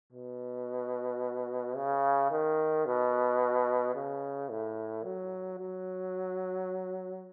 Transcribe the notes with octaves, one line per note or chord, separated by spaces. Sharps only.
B2
C#3
D#3
B2
C#3
A2
F#3
F#3